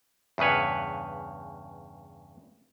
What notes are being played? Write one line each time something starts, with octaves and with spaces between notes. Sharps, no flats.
E2 G2 C#3 B4 C#5